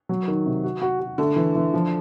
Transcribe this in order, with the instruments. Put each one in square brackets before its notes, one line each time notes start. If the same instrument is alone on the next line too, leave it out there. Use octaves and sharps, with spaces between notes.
[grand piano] F#3
D#3
C3
F#4
F#4
F#4
[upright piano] D3 [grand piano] A3
[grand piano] E3
E3
F3